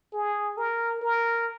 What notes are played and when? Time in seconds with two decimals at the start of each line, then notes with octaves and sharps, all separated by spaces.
0.13 G#4
0.57 A#4
1.01 A#4